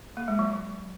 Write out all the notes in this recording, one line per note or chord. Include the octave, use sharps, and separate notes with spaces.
A#3
G#3
F#3